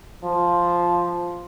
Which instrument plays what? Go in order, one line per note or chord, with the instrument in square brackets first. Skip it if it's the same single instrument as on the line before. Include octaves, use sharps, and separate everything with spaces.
[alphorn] F3